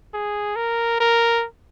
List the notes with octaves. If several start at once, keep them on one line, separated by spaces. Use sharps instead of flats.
G#4
A#4
A#4